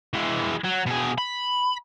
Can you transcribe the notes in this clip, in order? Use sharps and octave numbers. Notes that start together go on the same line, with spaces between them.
E3 G#3
F#3
B2 G#4
B5